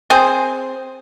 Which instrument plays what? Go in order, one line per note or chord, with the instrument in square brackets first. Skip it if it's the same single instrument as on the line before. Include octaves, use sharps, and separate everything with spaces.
[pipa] C4 G#4 C5